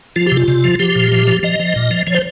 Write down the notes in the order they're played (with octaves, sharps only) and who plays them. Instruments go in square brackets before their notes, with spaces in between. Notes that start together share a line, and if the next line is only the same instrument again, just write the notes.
[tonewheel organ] F3 F4
G4
C3
F4
C3
F3
F3 G4
A#2
F3
F3
F3 D#5
F3
A#2
F3
F3 C#5
C5